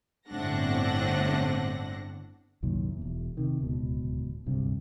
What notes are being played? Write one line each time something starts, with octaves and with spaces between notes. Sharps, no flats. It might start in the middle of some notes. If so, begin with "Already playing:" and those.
G1 A2 C4 D4 F#5 A#6
C2 F#2 A#2 D#3
E1 E2
C3 D#3
D1 C#2 B2
D1 C2 G2 C3